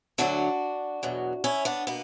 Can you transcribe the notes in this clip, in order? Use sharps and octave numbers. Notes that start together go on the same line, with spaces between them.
D2 D3 F#3 D4 F#4
E2 B2 F#3
C#4 E4
B3 D4
B2 A#3 B3